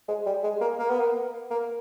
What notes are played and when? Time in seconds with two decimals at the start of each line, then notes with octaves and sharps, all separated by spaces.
0.08 G#3
0.26 G3
0.43 G#3
0.61 A#3
0.79 A#3
0.90 B3
1.00 A#3
1.51 A#3